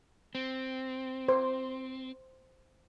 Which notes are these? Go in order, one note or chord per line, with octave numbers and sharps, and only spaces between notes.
C4
C5